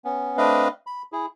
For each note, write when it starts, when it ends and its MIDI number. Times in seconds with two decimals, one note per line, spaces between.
0.05 0.37 59
0.05 0.37 61
0.37 0.68 57
0.37 0.68 60
0.37 0.68 62
0.37 0.68 71
0.37 0.68 75
0.37 0.68 77
0.87 1.02 83
1.12 1.26 64
1.12 1.26 68